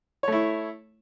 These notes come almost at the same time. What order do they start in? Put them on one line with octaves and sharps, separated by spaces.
C#5 A3 E4